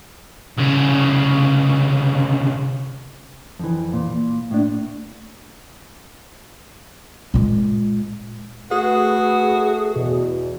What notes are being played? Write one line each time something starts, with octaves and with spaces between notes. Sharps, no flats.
C2 C#3
F2 E3
A#2
A2 D4
A#2 G#3
A3 F#4 G#4 B4
E2 B2